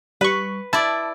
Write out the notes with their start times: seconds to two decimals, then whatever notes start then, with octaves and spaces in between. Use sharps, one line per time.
0.21 G3 B4 C#6
0.73 E4 D5 A5